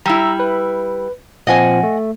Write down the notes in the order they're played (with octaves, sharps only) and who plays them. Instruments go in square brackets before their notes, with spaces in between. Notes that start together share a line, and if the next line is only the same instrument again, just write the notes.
[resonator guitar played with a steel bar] G3 E4 [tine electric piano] A#5 E6
[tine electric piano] B4
[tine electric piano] A#2 F3 C4 [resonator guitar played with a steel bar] D#5 F#5 G#5
[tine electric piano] A3